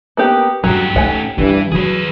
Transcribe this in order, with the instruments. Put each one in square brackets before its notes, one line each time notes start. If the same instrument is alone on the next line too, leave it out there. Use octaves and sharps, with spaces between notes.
[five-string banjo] A#3 B3 G4
[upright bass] G2 [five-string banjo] F#3 [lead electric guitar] C#4 G4
[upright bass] A3 D#4 [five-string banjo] F#5 G#5
[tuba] G2 [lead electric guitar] E3 [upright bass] C#4
[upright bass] E3 [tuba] F#3 [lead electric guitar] G#4 B4